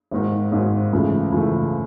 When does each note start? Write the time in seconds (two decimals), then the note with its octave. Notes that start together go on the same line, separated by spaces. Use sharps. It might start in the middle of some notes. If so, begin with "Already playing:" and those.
0.11 G#1 G#2 D#3
0.52 G#1 G#2 D#3
0.93 C#2 C#3 E3 A3
1.32 C#2 C#3 E3 A3